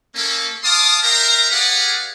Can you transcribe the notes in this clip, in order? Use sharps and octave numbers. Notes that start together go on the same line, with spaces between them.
A#3 C#4 A4
F5 A5 C6 D6 D#6
A#4 C5 E5 F5 G5 A#5
G4 G#4 B4 D5 F5 F#5